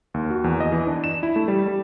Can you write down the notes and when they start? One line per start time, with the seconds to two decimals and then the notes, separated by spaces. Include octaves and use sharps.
0.14 D#2
0.30 F#4
0.44 E2
0.60 D#5
0.72 E3
0.87 D4
1.04 E7
1.23 E4
1.36 A3
1.48 G3
1.68 G3